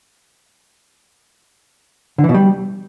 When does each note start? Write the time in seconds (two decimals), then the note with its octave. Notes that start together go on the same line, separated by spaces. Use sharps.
2.18 D3
2.24 E3
2.29 B2
2.34 G3